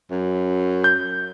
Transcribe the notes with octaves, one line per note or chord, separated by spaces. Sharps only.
F#2
G6